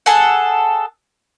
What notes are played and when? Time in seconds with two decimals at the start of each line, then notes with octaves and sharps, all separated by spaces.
0.06 G#4 A4 F#5